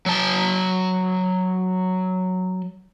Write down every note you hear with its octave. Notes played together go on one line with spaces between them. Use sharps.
F#3 A5